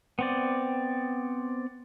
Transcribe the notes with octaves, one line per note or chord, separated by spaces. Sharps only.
B3 C4 D5